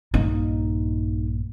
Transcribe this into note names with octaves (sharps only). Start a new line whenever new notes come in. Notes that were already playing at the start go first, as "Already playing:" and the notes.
A#1 G2 A#3 D#4